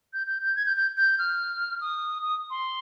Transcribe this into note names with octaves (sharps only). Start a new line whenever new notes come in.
G6
G6
G6
G#6
G6
G6
G6
F6
D#6
D#6
C6